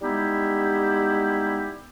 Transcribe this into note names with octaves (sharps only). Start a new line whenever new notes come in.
G3 G#3 B3 D#4 E4 G4